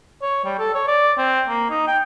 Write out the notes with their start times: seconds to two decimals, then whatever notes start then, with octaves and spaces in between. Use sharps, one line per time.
0.22 C#5
0.45 G3
0.59 A4
0.74 C#5
0.88 D5
1.18 C4
1.48 A#3
1.70 D#4
1.87 G5